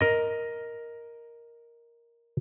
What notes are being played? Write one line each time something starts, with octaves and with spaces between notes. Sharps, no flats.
A#4 D#5